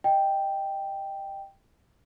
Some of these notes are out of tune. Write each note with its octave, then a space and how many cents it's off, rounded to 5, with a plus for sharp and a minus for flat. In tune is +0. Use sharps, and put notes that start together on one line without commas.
D#5 +0 G5 +0